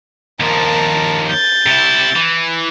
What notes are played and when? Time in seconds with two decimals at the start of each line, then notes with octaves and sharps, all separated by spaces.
0.40 D#2 F3 A#4 A5
1.29 G6 A6
1.66 C3 E4
2.16 E3